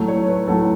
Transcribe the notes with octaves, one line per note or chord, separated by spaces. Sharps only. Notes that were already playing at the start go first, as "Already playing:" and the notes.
Already playing: A2 F#3 A3
C#5
B4
A2 F#3 A3 A4